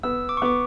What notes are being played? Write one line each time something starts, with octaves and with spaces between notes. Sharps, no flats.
B3 E6
D6
C#6
B3 D6